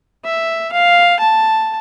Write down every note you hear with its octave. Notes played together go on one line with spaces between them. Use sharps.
E5
F5
A5